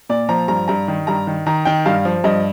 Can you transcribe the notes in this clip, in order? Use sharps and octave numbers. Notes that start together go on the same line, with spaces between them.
A#2 D5
F3 A#5
G2 A#5
G2 A#5
D#3
G2 A#5
D#3
D#3 A#5
D#3 G5
G2 F5
F3
G2 D#5